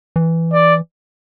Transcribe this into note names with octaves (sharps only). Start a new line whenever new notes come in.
E3
D5